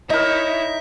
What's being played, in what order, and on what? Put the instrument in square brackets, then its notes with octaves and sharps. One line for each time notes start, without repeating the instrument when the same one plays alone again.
[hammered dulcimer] D#4 A#4 [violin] E4 C#5 [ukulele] D#5 [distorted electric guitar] E5